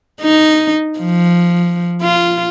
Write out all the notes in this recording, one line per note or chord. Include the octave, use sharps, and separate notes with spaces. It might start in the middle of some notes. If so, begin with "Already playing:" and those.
D#4
F3
F4